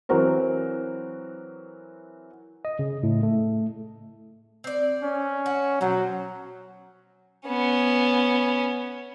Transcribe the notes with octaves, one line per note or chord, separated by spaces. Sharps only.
E3 F#3 C4 F#4 A#4 C5
D#5
C#3
A2
A3
C4 D5
C#4
F#4
B2 F#3 C5
B3 C#4